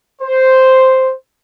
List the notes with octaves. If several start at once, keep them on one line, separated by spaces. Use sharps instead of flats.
C5